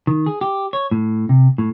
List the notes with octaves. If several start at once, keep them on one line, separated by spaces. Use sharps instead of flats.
D#3
G#4
G4
C#5
A2
C3
A2